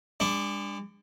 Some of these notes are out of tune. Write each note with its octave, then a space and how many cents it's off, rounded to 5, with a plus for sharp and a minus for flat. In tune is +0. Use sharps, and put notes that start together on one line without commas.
G#3 -40 D4 +0